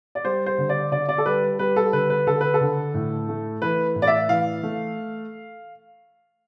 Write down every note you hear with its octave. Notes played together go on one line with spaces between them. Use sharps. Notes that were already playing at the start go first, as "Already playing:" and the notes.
D5
G3 C5
C5
D3
D5
D3 D5
D5
A4
G3 B4
G3 B4
A4
D3 B4
B4
D3 A4
B4
A4
D3
A2
A3
E3 B4
A2
D5
E5
E3 F5
A3